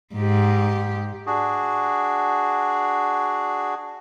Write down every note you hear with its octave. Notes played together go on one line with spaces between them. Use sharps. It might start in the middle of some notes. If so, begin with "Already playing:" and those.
G#2 G4
D4 F#4 G#4